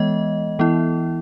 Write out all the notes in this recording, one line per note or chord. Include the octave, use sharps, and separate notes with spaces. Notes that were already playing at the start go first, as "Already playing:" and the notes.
Already playing: E3 G#3 B3 D#5
E3 B3 E4